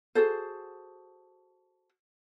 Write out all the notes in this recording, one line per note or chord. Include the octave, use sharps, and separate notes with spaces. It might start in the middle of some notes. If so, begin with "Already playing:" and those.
F#4 G#4 A4 C5